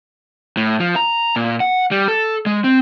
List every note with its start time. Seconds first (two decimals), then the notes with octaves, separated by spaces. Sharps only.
0.57 A2
0.80 F3
0.96 A#5
1.36 A#2
1.60 F#5
1.91 G3
2.08 A4
2.46 G#3
2.64 C4